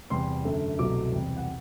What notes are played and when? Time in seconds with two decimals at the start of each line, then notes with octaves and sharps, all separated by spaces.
0.10 E2 C3 G3 C6
0.44 F#2 D3 A3
0.79 C2 B2 F#3 A3 D6
1.12 E2 C3 G3
1.37 F#5